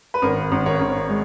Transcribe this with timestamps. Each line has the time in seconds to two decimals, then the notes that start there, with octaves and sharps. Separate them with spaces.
0.14 B4
0.22 G#1 A#4
0.52 G#1
0.66 A#4 C#5
0.80 G#1
1.09 G#3